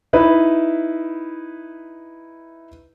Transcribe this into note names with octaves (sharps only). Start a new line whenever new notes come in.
D#4 E4 B4